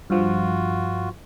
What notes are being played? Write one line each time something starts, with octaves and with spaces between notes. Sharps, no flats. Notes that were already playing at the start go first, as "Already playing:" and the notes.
G2 F3 F4 F#4